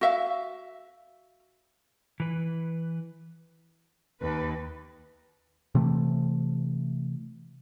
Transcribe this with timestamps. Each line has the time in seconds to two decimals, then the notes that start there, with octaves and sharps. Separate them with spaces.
0.01 F#4 E5 F5
2.20 E3 B4
4.21 D#2 B4
5.75 C3 E3 A3